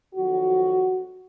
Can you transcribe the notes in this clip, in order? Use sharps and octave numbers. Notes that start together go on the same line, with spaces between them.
F2 D#3 F#3 F#4